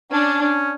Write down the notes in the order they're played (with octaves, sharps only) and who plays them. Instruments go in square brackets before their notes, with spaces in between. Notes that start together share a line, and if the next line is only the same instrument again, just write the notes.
[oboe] C#4 [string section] D4
[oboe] C#4